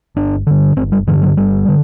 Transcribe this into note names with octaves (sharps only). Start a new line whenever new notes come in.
G1 D4
G2 D3
G1 C4
G3
G2 D3 E3
F#3
G1 G3
D3